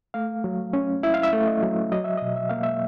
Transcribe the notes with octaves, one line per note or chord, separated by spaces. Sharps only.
A3 F5
F#3
C#4
E4 E5
F5
E5
A3
D#5
F#3
F#3 D#5
E5
B2 D#5
E5
A#3 F5
E5